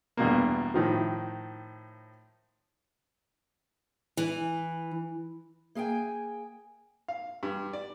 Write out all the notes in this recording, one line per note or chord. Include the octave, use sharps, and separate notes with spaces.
E2 G2 B2 A#3
A2 D#3 F3
E3
A#3 G#4 F5 G5 G#5
F5
G2
D5